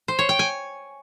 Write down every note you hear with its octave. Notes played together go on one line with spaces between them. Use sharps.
C5
C#5
G5
G#5